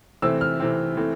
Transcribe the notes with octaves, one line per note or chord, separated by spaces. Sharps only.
C3 E3 A3 C4 E6
F6
C3 E3 A3 C4
E3 A3 C4